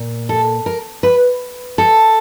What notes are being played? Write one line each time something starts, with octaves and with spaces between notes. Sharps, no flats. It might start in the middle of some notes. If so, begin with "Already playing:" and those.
Already playing: A#2
A4
A#4
B4
A4